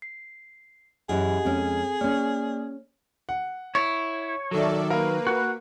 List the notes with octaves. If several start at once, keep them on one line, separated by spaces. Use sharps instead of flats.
C7
F#2 E3 G4 G#4 D#5 F#5
F2 G#3 C4 C#4 A4
A#3 C#4 C#5 D5 F6
F#5
E4 C#5
D#3 F#3 A4 D5 E5
A#3 A#4 B4 F5
F#4